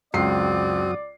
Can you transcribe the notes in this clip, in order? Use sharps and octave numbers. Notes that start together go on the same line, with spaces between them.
C#2 F#2 C4 F#4 D5 D#6 C7